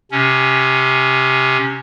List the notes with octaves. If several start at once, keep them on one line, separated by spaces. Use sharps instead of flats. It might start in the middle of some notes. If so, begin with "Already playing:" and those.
C3 C#4